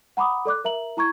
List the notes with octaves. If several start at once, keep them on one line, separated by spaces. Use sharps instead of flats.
F#5 A#5 B5 D6 D#6
A4 D5 D6 F#6
A#4 E5 A#5 F#7
E4 A#5 C#6 G#6